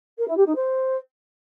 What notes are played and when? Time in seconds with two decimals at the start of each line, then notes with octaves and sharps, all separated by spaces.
0.18 A#4
0.27 E4
0.37 G4
0.46 D#4
0.55 C5